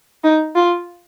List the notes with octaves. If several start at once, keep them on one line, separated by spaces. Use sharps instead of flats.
D#4
F4